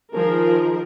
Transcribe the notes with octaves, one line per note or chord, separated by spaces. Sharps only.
D#3 F3 G#4 A#4